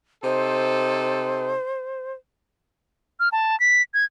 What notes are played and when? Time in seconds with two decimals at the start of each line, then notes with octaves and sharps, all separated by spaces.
0.24 C3 D#4 A4 C5
3.20 F6
3.32 A5
3.60 B6
3.94 G#6